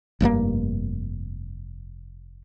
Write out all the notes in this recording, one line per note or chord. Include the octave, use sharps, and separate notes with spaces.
F1 G2 B2 A#3